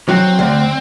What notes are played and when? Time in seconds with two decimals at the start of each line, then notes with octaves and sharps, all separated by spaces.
0.09 F#3 C4
0.39 D2